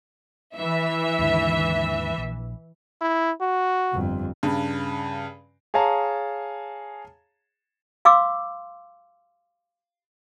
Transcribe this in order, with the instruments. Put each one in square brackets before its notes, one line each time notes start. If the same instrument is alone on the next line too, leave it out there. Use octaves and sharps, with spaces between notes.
[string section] E3 E5
[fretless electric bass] D#2 G#2 D3
A#1
[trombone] E4
F#4
[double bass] G1 F2
[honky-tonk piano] G2 C#3
[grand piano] G#4 C#5 F5 A5 A#5
[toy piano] F5 C6 D6 E6